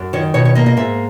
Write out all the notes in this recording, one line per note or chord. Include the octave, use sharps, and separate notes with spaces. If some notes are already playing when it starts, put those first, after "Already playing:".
Already playing: F#2
D#3 C#5
B2 C#5
C#5
A#3 D#5
D#5
G#2 E5